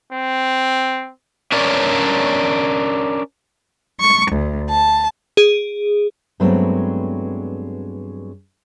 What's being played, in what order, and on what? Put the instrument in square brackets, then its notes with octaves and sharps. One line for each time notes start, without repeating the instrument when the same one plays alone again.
[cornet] C4
[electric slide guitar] C#4 D4 A#4 C#5 D5
[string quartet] C#6
D2
A5
[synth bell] G#4
[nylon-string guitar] G2 F#3 G#3 A3 B3 C4